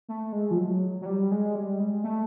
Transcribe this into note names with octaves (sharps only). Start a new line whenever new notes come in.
A3
G#3
F3
F#3
F#3
G3
G#3
G3
G#3
A3